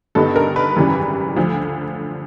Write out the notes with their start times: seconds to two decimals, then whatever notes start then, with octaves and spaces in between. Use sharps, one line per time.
0.15 G2 D3 G3 B3 D#4 A4
0.36 A#4
0.56 B4
0.76 G#1 F#2 C#3 E3 G3
1.36 D2 D3 F3